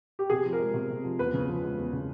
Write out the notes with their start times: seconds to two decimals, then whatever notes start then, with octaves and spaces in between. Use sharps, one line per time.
0.19 G4
0.30 C3 G#4
0.44 F3
0.53 A#4
0.60 G#3
0.74 C3
0.90 C3
1.04 F3
1.19 E2 B4
1.34 C#3
1.48 F3
1.63 G#3
1.78 E2
1.93 C#3